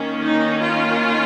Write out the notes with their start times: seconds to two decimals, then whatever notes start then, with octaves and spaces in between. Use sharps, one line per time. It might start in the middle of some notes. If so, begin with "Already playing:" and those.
Already playing: D#3 A#3 C#4
0.25 D#4
0.62 F4